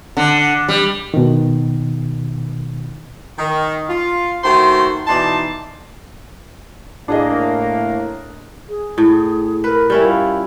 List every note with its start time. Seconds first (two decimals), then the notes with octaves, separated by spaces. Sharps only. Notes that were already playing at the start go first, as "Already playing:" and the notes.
0.17 D3
0.68 G3
1.14 B2 D#3
3.38 D#3
3.89 F4
4.44 D#3 A3 F#4 C5 C6
5.07 B2 E3 D#4 D5 A5 C6
7.08 A2 A#3 D4 G#4 D#5
8.68 G#4
8.98 A2
9.64 A#4 B4
9.90 G3 C#4 E4
10.03 F4